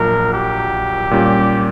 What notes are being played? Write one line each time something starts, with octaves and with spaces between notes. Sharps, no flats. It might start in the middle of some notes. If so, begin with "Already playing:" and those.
Already playing: A#1 A#2 F#3 A#4
G4
A#2 G3 C#4